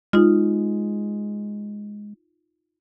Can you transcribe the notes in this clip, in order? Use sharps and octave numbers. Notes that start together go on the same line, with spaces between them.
G#3 D#4 F4